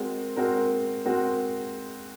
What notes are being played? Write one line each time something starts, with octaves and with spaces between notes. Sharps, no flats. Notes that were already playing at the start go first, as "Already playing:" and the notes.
Already playing: G#3 C4 F#4 A#4
G#3 C4 F#4 A#4
G#3 C4 F#4 A#4